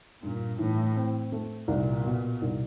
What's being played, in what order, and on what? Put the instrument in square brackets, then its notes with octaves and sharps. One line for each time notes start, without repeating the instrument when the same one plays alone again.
[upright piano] G2 [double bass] A#2
[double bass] A2 [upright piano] E3
[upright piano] C4
A3
[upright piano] C2 [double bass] A#2
[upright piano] B2
C2